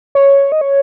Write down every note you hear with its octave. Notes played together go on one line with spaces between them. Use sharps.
C#5
D#5
C#5